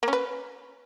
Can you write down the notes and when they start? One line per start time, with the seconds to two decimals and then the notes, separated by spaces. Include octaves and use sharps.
0.03 A#3
0.08 C#4
0.13 B4